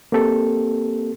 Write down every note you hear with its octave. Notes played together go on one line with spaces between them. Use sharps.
A#3 C4 G4 A4